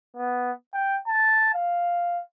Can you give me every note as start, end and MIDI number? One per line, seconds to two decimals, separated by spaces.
0.17 0.51 59
0.74 0.96 79
1.07 1.53 81
1.54 2.21 77